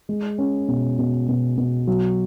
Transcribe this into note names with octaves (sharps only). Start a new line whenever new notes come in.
G#3
C#4
B2
B2
B2
B2
F#3